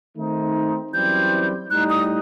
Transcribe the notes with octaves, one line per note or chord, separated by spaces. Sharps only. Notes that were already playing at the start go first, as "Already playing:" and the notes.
D#3 A3 C4 D#4
F#2 E3 G3 C4 G6
A2 G3 D#4 F#6
D#6